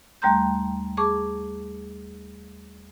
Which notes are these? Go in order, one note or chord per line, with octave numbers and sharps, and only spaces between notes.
D#2 G3 A3 A#5 C6 G6
G#4 A5 C#6 D6